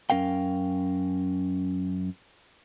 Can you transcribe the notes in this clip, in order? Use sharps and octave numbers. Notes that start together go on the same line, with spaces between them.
F#2 C#4 A#4 F5 G5